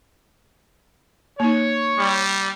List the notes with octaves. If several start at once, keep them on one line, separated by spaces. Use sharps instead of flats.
A#3 D#4 C#5
G3